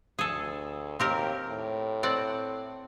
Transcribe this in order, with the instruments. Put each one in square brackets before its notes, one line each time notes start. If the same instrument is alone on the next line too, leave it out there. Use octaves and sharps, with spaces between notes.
[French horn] D2 [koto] G#4 A4
[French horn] D#2 [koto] C4 G4 A#4
[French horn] A2
[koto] C4 D5 F#5